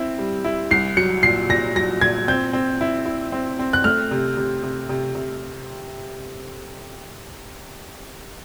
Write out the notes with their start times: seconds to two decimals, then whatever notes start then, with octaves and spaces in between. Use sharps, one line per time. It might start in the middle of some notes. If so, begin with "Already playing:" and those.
Already playing: C4 E4
0.19 G3
0.44 E4
0.71 C2 C7
0.97 F#3 C#7
1.23 A#2 C7
1.49 A#2 A#6
1.75 F#3 A#6
2.01 A#2 G#6
2.28 C4 G6
2.53 C4
2.81 E4
3.06 E4
3.32 C4
3.59 C4
3.73 F#6
3.84 A3 F6
4.11 C3
4.37 C3
4.63 C3
4.89 C3
5.15 C3